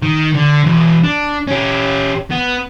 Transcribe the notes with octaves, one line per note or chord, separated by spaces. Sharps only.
D#3
D3
E2 B2
D4
C#4 G4
B3